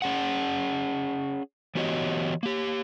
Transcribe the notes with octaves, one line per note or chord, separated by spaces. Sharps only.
C#4 G#4 F#5
E3 B3 F#4 G4 C#5 D#5
A#3 G4